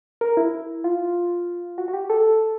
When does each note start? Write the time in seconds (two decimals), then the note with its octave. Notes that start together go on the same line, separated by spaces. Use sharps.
0.21 A#4
0.37 E4
0.84 F4
1.78 F#4
1.88 F#4
1.94 G4
2.10 A4